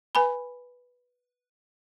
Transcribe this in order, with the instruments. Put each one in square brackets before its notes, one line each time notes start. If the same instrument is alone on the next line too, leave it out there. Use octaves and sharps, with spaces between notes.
[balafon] B4 G#5 B5